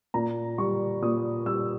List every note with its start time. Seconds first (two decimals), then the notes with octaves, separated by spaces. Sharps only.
0.14 A#2 A#5
0.58 G3 C#6
1.02 A#2 D#6
1.46 G3 E6